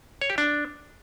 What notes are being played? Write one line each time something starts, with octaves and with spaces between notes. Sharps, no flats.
C#5
G4
D4